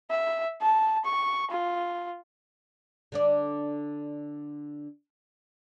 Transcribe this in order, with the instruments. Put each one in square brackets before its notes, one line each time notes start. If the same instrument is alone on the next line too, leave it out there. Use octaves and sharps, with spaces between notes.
[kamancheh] E5
A5
C#6
F4
[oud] D3 D4 D5